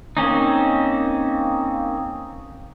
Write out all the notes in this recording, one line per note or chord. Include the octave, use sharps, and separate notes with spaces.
A#3 C4 C#4 D#4